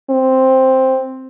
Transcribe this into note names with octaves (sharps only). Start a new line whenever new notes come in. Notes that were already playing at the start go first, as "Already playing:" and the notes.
C4